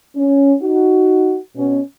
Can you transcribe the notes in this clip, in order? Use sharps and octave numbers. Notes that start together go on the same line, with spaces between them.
C#4
D#4 F#4
B2 C#4